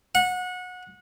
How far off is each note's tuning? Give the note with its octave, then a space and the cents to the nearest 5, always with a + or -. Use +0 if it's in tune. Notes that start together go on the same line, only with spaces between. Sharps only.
F#5 -25